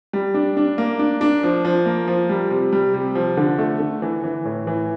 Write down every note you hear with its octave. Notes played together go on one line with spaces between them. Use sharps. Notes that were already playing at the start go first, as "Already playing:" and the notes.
G3
D4
D4
A#3
D4
D4
F3
F3
A#3
F3
G3
C3
G3
C3
F3
D3
A3
D3
E3
E3
A2
E3